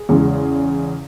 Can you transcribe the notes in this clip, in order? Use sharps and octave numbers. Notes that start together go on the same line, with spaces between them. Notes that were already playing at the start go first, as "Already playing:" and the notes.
Already playing: G#4
E2 C#3 G#3